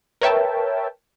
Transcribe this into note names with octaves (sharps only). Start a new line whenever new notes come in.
A#4 B4 C#5 E5 G5 A5